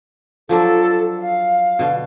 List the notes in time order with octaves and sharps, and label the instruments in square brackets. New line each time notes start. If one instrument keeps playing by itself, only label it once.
[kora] F3 F#3 D4 [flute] A4
[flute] F5
[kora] B2 D3